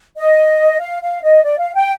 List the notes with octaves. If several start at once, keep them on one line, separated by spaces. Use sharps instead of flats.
D#5
F5
F5
D#5
D5
F5
G5